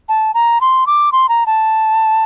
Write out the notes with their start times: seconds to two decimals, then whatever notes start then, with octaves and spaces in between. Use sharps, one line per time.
0.09 A5
0.34 A#5
0.61 C6
0.87 D6
1.12 C6
1.29 A#5
1.46 A5